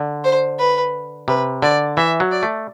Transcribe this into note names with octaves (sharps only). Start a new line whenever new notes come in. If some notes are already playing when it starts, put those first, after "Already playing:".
Already playing: D3
C5
B4
C3 B4
D3 D5
E3 E5
F#3
D5
A3